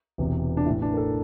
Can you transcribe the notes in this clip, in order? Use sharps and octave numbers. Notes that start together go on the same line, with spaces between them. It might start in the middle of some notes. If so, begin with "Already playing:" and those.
E1 E2 C3
D4
A1 A2 E3 E4
D4
A#4
A4